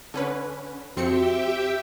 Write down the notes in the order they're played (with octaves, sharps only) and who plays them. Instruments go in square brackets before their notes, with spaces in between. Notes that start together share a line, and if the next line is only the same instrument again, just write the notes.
[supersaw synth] D3 C#4 B4
[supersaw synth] F2 C4 C#7 [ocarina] F#4 [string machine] G4 E5 G5